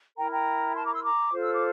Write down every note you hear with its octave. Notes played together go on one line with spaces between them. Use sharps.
E4 A#4 G5 A#5
G5 A#5
A5 C6
A#5 D6
C6 E6
A#5 D6
F4 A4 C5
E6
D6